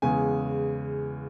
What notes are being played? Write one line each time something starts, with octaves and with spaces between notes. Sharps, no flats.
E2 C#3 G#3 B3 G#5